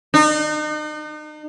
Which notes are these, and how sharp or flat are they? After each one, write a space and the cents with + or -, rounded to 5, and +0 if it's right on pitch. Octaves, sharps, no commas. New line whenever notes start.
D#4 -40